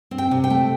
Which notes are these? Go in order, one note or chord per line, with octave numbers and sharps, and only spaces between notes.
C4
G5
C3
G5
A3